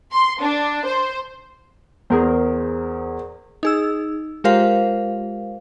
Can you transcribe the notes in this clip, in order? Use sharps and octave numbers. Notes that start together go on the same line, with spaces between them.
C6
D4
C5
E2 G#4 A#4 C5
D#4 G#4 E6
G#3 F4 G4 A#4 C5 F5